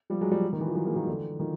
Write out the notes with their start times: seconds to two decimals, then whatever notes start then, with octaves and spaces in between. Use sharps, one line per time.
0.10 F3 G3
0.21 F#3 G#3
0.31 F3 G3
0.53 D#3
0.61 E3
0.68 F3
0.75 E3 F#3
0.85 G#3 A#3
0.96 D#3 F3
1.07 D3 E3
1.39 D#3 F3